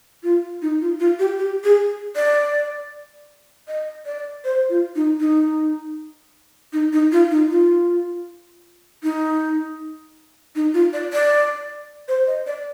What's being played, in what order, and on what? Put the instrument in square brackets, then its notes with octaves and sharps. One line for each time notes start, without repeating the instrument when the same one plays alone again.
[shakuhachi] F4
D#4
F4
F4
G4
G4
G#4
D5
D#5
D5
C5
F4
D#4
D#4
D#4
D#4
F4
D#4
F4
D#4
D#4
F4
D5
D5
C5
D#5
D5